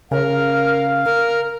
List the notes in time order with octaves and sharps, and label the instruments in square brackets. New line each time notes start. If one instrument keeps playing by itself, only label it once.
[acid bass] C#3 [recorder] A#4 [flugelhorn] F5
[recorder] A#4